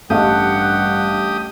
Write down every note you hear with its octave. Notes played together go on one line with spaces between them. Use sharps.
A1 G2 A3 G4 F5 F#5 D#6